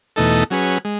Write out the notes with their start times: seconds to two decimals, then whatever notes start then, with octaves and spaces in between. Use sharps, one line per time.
0.16 E2 B2 A3 D#4 A4
0.50 F#3 C#4 G#4 B4
0.85 G#3